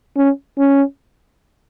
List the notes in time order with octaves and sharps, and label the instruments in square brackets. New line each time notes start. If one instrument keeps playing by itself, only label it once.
[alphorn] C#4
C#4